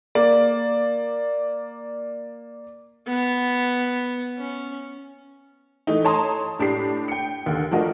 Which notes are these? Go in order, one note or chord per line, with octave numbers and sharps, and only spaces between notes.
A#3 D5
B3
C#4
E3 A3 D#4
C#5 A5 A#5 C6 D#6
A2 D4 G4 C7
G5 C#7
D#2 D3
F3 A3 D4 F#4 A#4 D#5